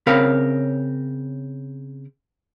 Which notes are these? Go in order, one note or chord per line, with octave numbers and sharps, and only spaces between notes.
C#3 C4 A#4 C#5 F5 B5